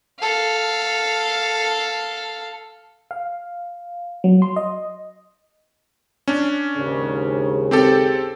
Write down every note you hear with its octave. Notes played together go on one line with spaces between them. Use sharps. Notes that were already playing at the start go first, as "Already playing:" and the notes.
A4 F5
F5
F#3
C6
D#5
C#4 D4
D#2 G#2 C#3
C4 G4 A4